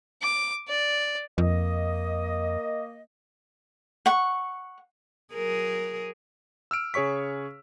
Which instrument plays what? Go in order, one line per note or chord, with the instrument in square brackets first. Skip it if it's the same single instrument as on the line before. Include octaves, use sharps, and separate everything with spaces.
[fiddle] D6
D5
[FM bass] F2 [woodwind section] A#3 D#5
[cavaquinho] F#5 C#6
[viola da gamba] F#3 G#4 A#4
[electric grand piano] E6 F6 D7
C#3 G#4 C#5 C#6 B6